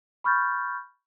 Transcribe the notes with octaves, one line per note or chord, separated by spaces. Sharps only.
B5 C#6 F6 G6 A6